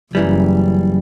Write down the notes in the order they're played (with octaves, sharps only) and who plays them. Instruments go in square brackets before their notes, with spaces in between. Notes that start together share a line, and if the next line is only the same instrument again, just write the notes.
[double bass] F#1 [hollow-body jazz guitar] F#2 E3 G3